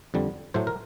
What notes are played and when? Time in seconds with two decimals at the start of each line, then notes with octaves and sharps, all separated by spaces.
0.14 F2 D3 G3
0.54 A2 F#3 A3 C5
0.67 A#4